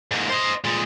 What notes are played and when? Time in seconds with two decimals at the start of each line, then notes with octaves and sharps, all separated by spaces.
0.11 G#2 A#3
0.29 C5 D#5
0.64 A#2 G#3